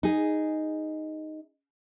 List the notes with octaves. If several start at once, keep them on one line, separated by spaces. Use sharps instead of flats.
D#4 G#4